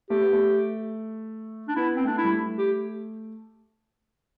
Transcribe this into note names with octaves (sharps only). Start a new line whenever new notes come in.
A3 G4
B3
A3
D4
B3 E4
C4
A3 D4
E4
G3
A3
G4